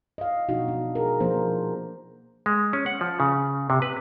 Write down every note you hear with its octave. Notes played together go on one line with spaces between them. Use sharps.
D#5 F5
B2 F3 D4 D#4 F#4
D4
G#4 A#4
F3 A#3 D4 C5
G#3
C#4
F#5
F3
C#3
C3
B4